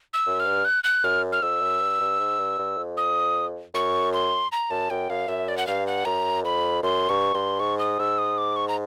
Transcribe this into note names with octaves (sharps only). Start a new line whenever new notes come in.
E6
F#2
F6
G2
F#6
F#6
F#2 F6
F6
F2 E6
F#2
G2
G2
G#2
G2
G2
F2
D#6
F#2 C#6
C6
A#5
F#2 A5
F#2 G5
F#2 F5
F#2 E5
D5
F#5
G2 F5
F#5
F#2 A#5
F2 B5
F#2 C6
G2 C#6
G2 C6
G#2 C#6
D#6
G#2 E6
D#6
D6
C#6
A#5